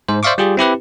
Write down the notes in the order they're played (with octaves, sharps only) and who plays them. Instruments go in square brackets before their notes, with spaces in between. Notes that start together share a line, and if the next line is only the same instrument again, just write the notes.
[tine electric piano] G#2 C5
C5 D5 E5 F5 C#6 D6
G3 F4 G4 G#4
C4 E4 G4 B4